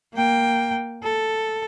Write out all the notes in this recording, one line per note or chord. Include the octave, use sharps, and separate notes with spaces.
A#3 G5
A4